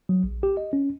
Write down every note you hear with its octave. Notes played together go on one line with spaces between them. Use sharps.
F#3
A#1
G4
D#5
C#4